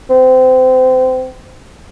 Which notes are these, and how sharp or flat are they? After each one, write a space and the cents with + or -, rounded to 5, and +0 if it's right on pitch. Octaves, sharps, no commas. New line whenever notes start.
C4 -25